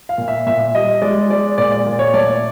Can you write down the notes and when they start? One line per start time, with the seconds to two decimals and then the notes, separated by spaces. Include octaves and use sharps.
0.09 F5
0.18 A#2
0.28 E5
0.47 A#2 E5
0.74 G3 D#5
1.02 G#3 D5
1.30 G#3 D5
1.58 A#2 D5
1.72 D5
1.86 A#2
1.99 C#5
2.14 A3 D5